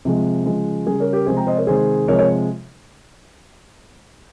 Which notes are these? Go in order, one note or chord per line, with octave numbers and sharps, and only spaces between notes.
C3 F3 G#3
C#3 F3 G#3
C#3 G3 G#4
A#4 C#5
G4 A#4
C3 F3 G#3 G#4 C5
G5 A#5
C5 D#5
A#4 C#5
C3 D#3 G#3 G#4 C5
C3 F3 G#3 A#4 C#5
A#4 C#5